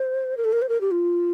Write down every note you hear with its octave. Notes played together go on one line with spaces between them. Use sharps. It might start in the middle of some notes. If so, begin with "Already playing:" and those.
Already playing: C5
A#4
A4
A#4
C5
A#4
G4
F4